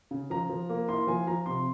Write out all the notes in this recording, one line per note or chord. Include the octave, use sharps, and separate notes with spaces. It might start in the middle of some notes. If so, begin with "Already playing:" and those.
C#3
F3 A#5
F3
A#3
E4 C6
F3 G#5
F3 A#5
C3 C6